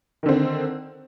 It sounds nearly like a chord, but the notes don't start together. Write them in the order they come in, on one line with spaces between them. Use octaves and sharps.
D#3 D3 C4